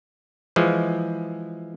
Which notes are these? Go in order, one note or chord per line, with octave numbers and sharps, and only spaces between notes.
E3 F3 G#3